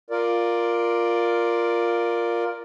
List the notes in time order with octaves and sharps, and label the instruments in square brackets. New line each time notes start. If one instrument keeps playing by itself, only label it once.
[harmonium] F4 A#4 D5